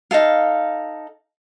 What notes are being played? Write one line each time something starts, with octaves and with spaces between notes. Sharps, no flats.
D#4 E4 A4 F5